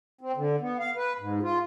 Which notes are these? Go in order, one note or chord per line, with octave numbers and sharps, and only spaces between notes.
C4
D3
B3
F5
B4
G#2
F4